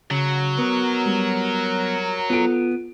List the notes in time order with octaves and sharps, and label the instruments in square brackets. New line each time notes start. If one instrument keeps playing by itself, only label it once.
[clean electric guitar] C#3 [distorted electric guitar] F#3
[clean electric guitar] B3 [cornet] A#4
[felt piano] G3
[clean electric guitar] B3 [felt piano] F4 A4 D7